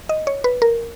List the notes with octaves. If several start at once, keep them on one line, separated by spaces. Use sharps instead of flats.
D#5
C#5
B4
A#4